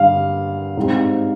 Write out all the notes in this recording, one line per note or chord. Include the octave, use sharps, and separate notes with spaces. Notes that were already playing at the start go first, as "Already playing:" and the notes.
Already playing: G2 D3 G3 F5
G#2 G3 C4